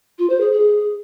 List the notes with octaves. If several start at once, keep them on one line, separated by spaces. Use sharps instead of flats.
F4
C5
G#4
G#4